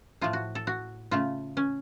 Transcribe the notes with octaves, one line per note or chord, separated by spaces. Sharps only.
A2 F3 A3 F4
F#4
A4
F#4
C#3 A3 F4
C#4